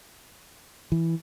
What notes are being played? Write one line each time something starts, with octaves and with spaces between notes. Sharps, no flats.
E3